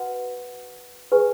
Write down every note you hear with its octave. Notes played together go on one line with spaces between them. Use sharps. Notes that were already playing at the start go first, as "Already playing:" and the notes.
Already playing: F#4 B4 F#5
G#4 B4 G#5 C#6